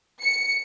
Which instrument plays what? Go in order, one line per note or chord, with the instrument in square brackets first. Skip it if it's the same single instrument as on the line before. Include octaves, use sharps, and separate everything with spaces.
[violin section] C#7